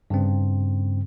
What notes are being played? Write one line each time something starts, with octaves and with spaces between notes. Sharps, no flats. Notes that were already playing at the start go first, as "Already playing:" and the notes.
G2 C#3 C4